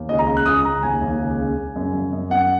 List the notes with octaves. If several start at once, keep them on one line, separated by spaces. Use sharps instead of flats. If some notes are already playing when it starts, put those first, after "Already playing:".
Already playing: D#2
C#2 D#5
A#5
C#3
F#6
C#2 D#6
C#2 A#5
D#2 G#5
D#2
C#2
C#3
C#3
F#2
F#2
F#2
F#2 F#5